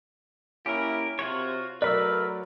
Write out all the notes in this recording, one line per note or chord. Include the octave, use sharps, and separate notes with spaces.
A#3 C#4 E4 G4 A#4
C3 F4 F#4 C#5
F#3 A3 A#4 B4 D5 B5 E6